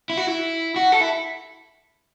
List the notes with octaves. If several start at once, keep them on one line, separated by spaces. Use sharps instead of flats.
E4
F#4
E4
F#4
A4
E4